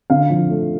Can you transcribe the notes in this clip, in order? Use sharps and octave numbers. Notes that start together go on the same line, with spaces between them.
D3 F5
F3
A3